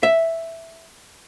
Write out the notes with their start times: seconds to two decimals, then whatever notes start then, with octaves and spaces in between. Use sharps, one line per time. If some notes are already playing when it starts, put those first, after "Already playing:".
0.03 E5